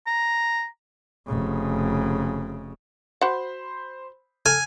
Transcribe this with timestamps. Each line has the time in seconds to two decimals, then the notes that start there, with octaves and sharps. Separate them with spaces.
0.07 A#5
1.27 F1 C#3
3.21 F#4 C5 F#5 B5 C6
4.46 A4 G#5 F6